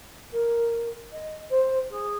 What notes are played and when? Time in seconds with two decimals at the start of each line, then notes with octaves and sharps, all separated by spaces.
0.33 A#4
1.12 D#5
1.50 C5
1.90 G#4